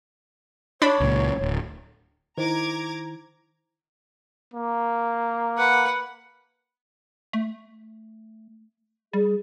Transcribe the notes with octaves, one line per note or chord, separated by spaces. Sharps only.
D4 C#5 B5
C#2 A#2
D1
D#3 E4 C5 A#5 D6 G#6
A#3
B4 F#5
A3
G3 G#4